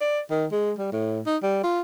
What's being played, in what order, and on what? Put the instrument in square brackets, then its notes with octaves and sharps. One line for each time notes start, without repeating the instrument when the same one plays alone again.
[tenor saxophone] D5
D#3
G#3
G3
A2
D#4
G3
F4